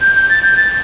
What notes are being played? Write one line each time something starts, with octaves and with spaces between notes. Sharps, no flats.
G6
G6
A6
G6
A6